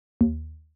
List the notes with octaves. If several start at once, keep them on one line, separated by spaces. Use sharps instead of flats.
D#2